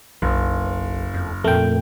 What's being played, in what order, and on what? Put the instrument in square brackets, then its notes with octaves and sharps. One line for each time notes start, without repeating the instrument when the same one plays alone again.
[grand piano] F#1 [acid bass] B1
[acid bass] F2
[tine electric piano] F2 A#2 [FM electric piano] A3 G5 [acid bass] A#4